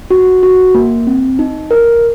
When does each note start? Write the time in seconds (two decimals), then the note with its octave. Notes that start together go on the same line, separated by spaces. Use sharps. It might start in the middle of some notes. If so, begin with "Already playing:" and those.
0.11 F#4
0.43 F#4
0.75 A#3
1.07 C4
1.39 D#4
1.71 A#4